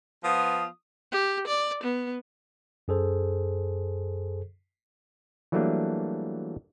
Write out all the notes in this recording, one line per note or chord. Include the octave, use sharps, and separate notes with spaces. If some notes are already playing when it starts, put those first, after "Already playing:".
F3 B3 F4 D#6
G4
D5
B3
F#2 G#4 A4 C5
E3 F#3 G3 A3 A#3 D4